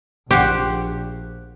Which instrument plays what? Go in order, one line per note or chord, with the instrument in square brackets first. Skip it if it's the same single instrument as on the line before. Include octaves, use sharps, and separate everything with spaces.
[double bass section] A#1 [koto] G4 [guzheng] C5 F#5